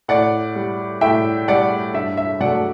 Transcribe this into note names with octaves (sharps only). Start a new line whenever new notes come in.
A2 D5 F#5
G3
A2 E5 G5
G3 D5 F#5
G2 E5
E5
F#3 A3 D5 F#5